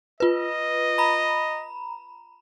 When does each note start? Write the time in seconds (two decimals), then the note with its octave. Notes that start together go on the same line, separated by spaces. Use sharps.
0.20 F4 B4 D#5
0.98 A#5 B5